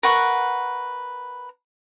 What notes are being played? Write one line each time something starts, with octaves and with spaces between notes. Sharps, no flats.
A#4 B4 F#5 C#6